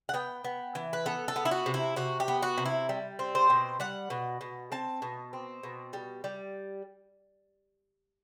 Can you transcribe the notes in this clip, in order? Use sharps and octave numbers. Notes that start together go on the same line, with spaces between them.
F#5
B3 G5
B3
E3
B4
B3 A4
A4
B3
E4
F#4
C3
E4
C3 F#4
G4
B3
F#4
C3
E4
G3
C4
C5
B2
G3 F#5
B2
B2
C4 A5
B2
C4
B2
G3
G3